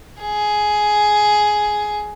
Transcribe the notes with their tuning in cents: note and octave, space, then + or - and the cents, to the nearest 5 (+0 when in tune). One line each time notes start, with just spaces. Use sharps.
G#4 +10